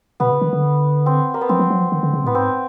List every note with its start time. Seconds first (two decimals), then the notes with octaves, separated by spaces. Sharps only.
0.20 B2 B3
0.31 C#3
0.42 D#3
0.53 D3
1.06 C4
1.34 A#3
1.41 B3
1.49 F3 C4
1.59 F3
1.70 F#3
1.81 F3
1.92 D#3
2.03 D3
2.13 C#3
2.24 A2 B3
2.35 G#2 C4